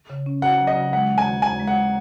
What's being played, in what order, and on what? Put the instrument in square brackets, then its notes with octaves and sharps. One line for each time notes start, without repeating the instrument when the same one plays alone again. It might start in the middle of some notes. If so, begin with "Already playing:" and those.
[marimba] C#3
C#4
[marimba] F#4 [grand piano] F#5
[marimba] F#3
[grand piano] D#5
[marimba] C#3
[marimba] G#3 [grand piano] F#5
[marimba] D#2
[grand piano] G#5
[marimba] D#3
[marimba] D#2 [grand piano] G#5
[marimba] G#3
[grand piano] F#5